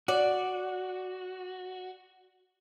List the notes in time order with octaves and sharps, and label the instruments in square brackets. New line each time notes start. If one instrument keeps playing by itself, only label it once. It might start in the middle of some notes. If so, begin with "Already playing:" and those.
[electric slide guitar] F#4 [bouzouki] D5